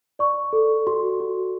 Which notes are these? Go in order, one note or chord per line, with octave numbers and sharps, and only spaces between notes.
D5 C#6
A4
F#4 C6
F#4